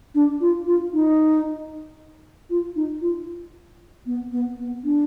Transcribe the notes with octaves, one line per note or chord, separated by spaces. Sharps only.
D4
F4
F4
D#4
F4
D#4
F4
B3
B3
B3
D4